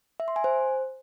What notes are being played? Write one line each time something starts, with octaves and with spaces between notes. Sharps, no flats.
E5
C6
G#5
C5